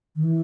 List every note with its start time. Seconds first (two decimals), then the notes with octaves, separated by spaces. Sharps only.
0.16 D#3
0.23 E3